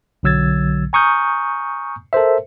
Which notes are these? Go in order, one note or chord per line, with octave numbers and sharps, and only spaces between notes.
B1 D3 F#3 E6 G#6 A6
G#5 A#5 C#6 D#6 F6 G6
A4 A#4 C5 E5